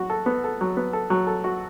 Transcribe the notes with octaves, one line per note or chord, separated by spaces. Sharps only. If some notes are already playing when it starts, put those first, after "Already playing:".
Already playing: F#3 F#4
A4
B3
A4
F#3
B3
A4
F#3
A4
F#4